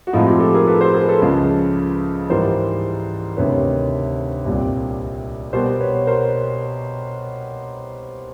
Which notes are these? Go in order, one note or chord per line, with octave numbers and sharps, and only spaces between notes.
F#4
A2 F3 G#3 C4 D#4 F4
F4 G4
G4 A4
G#4 A#4
A4 B4
A#4 C5
G#4 A#4
A4 B4
C#2 C#3 F3
G#2 E3 G3 A#4 C5
D2 C3 D#3 B4 C#5
C2 A#2 G3 C4
B2 G3 B3 A#4 C5
B4 C#5
A#4 C5